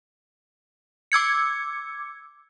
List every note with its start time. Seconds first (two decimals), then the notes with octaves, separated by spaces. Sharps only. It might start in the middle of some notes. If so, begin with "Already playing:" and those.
1.12 D6 E6 G#6 C#7